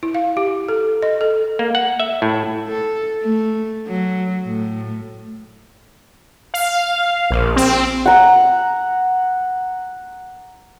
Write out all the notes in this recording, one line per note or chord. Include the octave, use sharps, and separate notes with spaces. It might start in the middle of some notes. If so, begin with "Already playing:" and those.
E4
F5
G4
A4
D#5
A4
A#3
F#5
E5
A2
A4
A3
F#3
A2
F5
A#1
C4
F#5 A#5